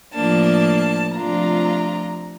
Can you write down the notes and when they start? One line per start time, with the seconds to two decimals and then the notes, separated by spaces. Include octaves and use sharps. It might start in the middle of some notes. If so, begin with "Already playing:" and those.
0.14 A2 F3 A#3 D4 A5
1.15 C3 F3 A3 D4 F4 A#5